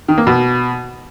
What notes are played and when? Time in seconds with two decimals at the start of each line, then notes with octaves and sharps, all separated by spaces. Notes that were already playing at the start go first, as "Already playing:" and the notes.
0.08 D#3
0.18 A#3
0.27 B2